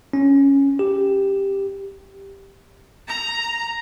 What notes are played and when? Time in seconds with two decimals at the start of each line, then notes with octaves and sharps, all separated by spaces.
0.13 C#4
0.79 G4
3.08 A#5